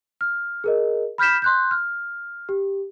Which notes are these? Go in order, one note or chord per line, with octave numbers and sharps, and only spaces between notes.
F6
G#4 A#4 D#5
B5 F6 G6 B6 E7
C6 F#6 G6
F6
G4